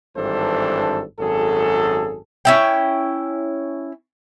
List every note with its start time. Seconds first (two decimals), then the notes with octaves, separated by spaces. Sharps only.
0.16 G#1 G2 E3 D4 A4 C5
1.20 G#1 F#2 G#4 A4
2.45 C#4 E4 G5